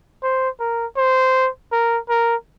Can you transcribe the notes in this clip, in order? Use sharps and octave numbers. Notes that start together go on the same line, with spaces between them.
C5
A#4
C5
A#4
A#4